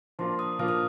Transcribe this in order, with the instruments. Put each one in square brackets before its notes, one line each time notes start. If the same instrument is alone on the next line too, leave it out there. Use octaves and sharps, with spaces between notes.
[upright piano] F3 A#3 D4 F4 [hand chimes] C6
[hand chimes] D#6
[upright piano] F3 A#3 D4 F4 [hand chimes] F6
[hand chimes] D#6